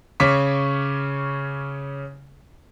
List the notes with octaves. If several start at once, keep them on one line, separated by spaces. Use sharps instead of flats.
C#3 C#4 C#5 C#6 D6 B6